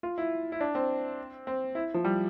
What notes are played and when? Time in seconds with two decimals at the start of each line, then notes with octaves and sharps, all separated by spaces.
0.03 F4
0.18 E4
0.52 E4
0.60 D4
0.75 C4
1.47 C4
1.75 E4
1.94 F3
2.04 G3